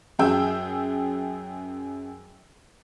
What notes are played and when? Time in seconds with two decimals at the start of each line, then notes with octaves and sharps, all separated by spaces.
0.19 F#2 F#4 G#4 G5 E6